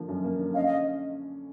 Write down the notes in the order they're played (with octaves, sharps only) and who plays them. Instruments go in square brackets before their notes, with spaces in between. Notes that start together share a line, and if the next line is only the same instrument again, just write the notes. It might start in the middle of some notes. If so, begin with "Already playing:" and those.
Already playing: [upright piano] D3 F3 A#3
F#2
A#3
D3
[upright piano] C#4 [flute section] D#5 F5
[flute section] D#5 F5